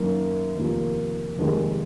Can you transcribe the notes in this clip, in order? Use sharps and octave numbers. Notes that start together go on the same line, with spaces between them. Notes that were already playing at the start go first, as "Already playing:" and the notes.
Already playing: F#2 D#3 A#3 D#4
F1 D#2 D#3 A#3 F4
F1 D#2 D#3 G#3